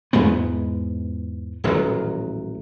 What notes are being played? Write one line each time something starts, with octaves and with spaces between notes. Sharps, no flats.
E2 G#2 G#3 B3
D#1 A1 D#3 F#3